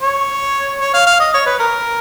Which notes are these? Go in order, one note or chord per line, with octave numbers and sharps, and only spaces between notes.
C#5
C#5
F5
F5
D#5
C#5
B4
A#4